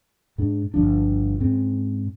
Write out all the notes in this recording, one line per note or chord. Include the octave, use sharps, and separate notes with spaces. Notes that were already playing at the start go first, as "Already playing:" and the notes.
G#2 D4
G1 F2 F3 D4
G#2 C4 C#4